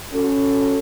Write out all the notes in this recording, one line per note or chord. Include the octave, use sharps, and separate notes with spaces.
C#4 F#4 A4